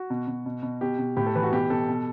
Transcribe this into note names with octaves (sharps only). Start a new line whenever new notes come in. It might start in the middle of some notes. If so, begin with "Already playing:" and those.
Already playing: F#4
B2
B2
B2
B2
B2 G4
B2
A2 G4
A4
E3 B4
F#4
B2 G4
B2 A4
B2